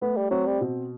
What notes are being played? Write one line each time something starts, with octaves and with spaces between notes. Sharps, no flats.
A3 B3
G3
F#3 C4
G3
B2